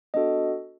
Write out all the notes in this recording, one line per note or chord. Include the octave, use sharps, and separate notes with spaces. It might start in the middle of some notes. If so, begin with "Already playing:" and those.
B3 D4 F#4 A4 D#5